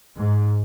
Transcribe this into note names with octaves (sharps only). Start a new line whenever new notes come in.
G#2